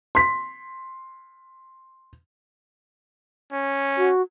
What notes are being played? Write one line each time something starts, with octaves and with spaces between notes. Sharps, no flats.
C6 B6
C#4
F#4